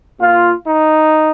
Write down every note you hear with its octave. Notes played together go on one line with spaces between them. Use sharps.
A#2 F4
D#4